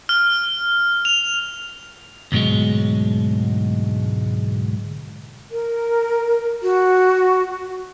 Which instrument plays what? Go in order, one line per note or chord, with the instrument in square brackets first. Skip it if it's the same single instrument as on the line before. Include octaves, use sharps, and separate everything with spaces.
[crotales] F6
F7
[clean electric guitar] D2 G#2 B2 F#3 G#3
[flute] A#4
F#4